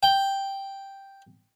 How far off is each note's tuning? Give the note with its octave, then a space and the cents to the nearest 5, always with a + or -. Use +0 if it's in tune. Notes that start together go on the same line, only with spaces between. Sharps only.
G5 +0